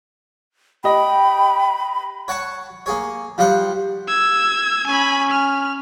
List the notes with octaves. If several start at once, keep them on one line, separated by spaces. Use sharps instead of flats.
G4 D#5 G5 B5
C#5 F#5 A5 C#6
A#3 G#4 C#5
F3 G3 F4 C5 F#5
E6 G#6
C#4 G#5 B5
F6